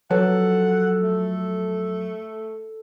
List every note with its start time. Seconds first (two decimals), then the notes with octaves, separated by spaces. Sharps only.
0.11 F#2 F3 F#3 A4 B4 C#5 F#5
1.02 A3